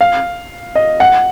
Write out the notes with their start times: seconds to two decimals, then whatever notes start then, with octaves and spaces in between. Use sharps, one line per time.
0.01 F5
0.75 D#5
1.00 F#5